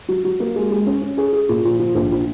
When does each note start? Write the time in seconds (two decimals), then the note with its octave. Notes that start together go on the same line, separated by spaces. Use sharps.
0.08 F#3
0.24 F#3
0.40 A#3
0.56 G#3
0.71 G#3
0.86 C#4
1.02 C#4
1.18 G#4
1.33 G#4
1.49 A#2
1.65 F3
1.79 F3
1.95 A#1
2.11 F3